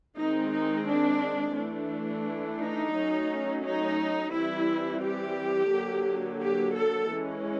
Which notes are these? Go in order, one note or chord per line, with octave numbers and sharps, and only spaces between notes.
D#3 G#3 C4 D#4
D#4
D4
E3 A3 D4
D#4
F#3 A3 C#4
D#4
E3 G3 C4 E4
G4
D3 F#3 A#3
G4
A4
E3 G#3 C#4